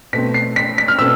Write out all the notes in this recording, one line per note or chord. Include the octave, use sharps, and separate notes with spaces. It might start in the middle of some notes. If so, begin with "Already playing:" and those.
B2 A3 C4 B6
C7
B6
B6
F6
B2 A3 C4 E6